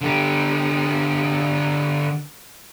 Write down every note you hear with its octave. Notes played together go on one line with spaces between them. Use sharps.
D3 G4